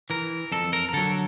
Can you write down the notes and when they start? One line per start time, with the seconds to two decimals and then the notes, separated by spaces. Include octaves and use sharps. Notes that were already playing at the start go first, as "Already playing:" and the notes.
0.10 E3 A#4
0.52 F2 A4
0.73 A#4
0.89 A#4
0.93 D3 F#3 A4